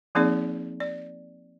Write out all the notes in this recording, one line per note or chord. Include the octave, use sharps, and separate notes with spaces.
F3 A#3 C4 D#4 G#4 D5
D5